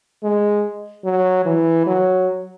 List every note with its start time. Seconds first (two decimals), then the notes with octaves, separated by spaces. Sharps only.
0.23 G#3
1.05 F#3
1.45 E3
1.87 F#3